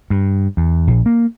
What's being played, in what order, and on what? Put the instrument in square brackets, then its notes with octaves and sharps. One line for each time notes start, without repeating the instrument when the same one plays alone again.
[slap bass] G2
E2
A#1
A#3